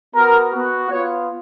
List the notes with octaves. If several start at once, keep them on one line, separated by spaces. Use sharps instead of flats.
B3 F#4 A#4
B3 F#4
B3 F4 C#5